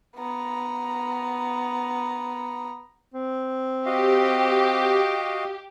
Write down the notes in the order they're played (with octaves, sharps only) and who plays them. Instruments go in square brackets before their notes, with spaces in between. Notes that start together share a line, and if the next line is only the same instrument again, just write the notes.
[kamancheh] B3 A#5
[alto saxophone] C4
[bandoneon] F#4 D#5 F5 [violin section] G4